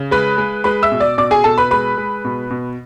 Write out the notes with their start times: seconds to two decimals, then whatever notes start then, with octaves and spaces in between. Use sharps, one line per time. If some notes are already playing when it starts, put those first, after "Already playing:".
Already playing: C#3
0.11 G#3 B4 B5
0.38 G#3
0.64 G#3 B4 B5
0.83 E5 E6
0.91 B2
1.00 D5 D6
1.18 B2 D5 D6
1.31 G#4 G#5
1.44 B2 A4 A5
1.58 B4 B5
1.71 G#3 B4 B5
1.98 G#3
2.24 B2
2.51 B2